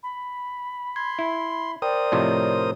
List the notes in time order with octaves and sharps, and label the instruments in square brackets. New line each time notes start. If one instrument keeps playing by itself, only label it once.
[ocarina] B5
[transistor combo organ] C6 [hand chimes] G#6
[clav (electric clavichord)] E4
[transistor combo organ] A#4 C5 D#6 [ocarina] D5 [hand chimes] G5
[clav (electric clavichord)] A2 C3 F3 [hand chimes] C#5 D#5